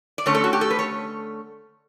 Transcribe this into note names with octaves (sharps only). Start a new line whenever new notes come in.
D5
D3 A3 C#4 C#5
A4
F#4
G4
A4
B4
C#5